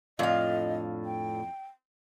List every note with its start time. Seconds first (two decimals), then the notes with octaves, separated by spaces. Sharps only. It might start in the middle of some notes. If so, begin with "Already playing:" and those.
0.19 F2 A2 D4 F4 D#5 F5
1.05 G5